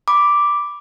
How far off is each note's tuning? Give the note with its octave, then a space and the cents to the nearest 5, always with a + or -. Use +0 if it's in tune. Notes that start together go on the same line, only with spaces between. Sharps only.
B5 +0 D6 +0